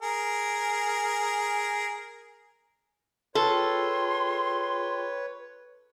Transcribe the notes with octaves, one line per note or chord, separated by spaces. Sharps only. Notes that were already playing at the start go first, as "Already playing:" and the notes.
G#4 A#4
F4 G#4 A4 B4 C#5 G5 C6